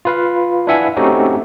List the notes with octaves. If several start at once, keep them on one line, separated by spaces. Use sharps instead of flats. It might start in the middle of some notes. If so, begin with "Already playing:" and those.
F4 B4 F5
D4 E4 B4 E5 F#5 G#5
A3 C4 C#4 D#4 F#4 G4